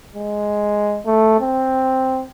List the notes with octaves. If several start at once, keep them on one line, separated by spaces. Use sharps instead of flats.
G#3
A3
C4